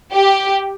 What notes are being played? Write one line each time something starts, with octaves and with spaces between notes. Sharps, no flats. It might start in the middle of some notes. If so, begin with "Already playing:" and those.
G4